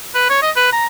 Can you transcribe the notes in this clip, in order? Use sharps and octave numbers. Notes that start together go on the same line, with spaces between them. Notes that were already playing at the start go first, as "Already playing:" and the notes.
B4
C#5
D#5
B4
A#5